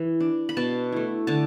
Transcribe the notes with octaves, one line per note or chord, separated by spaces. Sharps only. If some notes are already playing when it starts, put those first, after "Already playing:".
Already playing: E3
D4
B5
B2 A5
A3 E4
D3 A5